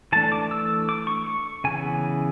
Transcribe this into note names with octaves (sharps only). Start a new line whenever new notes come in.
E3 A3 D4 A5
D6
E6
D6
C#6
C#6
C#3 E3 B3 G#5